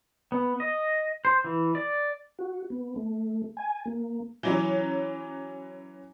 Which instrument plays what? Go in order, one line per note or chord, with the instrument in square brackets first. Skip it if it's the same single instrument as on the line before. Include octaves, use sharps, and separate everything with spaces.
[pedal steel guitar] B3
D#5
C5
E3
D5
[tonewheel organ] F#4
B3
A3
G#5
A#3
[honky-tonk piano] E3 F#3 C#4